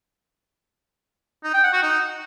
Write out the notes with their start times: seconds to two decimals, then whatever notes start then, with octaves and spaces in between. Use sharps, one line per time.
1.44 D#4
1.53 G5
1.63 F#5
1.73 F#4
1.83 D#4